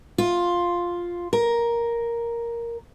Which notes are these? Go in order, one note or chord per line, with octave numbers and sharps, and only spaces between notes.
F4
A#4